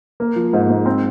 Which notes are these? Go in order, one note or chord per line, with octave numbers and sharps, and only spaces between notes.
A#3
F3
G#2
G#2
C4